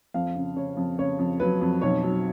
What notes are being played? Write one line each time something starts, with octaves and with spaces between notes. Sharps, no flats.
F2 F5
C#3
C#3 C#5
F2
C#3 C#5
F2
F#3 B4
F2
B1 C#5
F#3